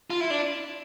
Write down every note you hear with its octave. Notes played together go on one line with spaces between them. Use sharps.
F4
E4
D4